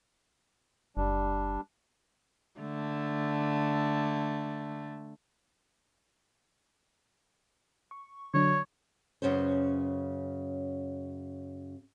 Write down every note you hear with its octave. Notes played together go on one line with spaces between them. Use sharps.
F#1 G3 D4
D3 A3
C#6
D3 F#3 D4 C#5
F#2 C#3 B3 C#4 C5